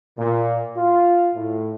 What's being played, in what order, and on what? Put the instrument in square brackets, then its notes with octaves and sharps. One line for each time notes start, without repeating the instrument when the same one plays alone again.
[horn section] A#2
F4
A2